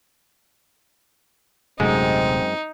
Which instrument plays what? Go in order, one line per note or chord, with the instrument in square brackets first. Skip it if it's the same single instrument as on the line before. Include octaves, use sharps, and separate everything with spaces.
[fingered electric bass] D#1 C3 A3 [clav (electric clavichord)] F#2 G#3 [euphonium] C4 [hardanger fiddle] D#4